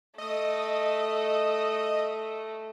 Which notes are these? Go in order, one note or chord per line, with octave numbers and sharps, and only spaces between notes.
A3 D#5 D#6